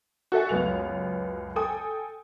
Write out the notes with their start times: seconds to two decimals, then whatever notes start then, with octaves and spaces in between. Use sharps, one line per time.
0.32 F#4 A4 E5 G#5
0.49 C#2 F#2 B3 F7
1.56 A4 G5 G#5 D#6